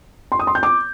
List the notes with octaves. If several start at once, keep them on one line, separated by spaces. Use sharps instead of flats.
C6
D#6
C6
G6
D6